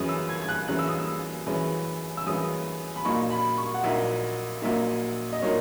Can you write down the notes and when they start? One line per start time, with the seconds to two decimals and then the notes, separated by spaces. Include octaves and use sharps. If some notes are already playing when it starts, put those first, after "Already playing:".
Already playing: F#2 E3 G#3 C#4 D#6
0.09 E6
0.29 G#6
0.42 G#6
0.49 F#6
0.68 F#2 E3 G#3 C#4 F#6
0.79 E6
0.88 D#6
0.99 E6
1.47 F#2 E3 G#3 C#4
2.17 E6
2.26 F#2 E3 G#3 C#4 D#6
2.96 B5
3.05 A#1 A#2 F#3 A#3 D#4 C#6
3.30 B5
3.58 C#6
3.74 F#5
3.83 A#1 A#2 F#3 A#3 D#4 E5
4.62 A#1 A#2 F#3 A#3 D#4 E5
5.32 D#5
5.42 A#2 F#3 A#3 D#4 C#5